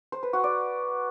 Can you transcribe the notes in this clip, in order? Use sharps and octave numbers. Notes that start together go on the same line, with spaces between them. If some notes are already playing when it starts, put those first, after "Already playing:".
C5
B4
F#4
D5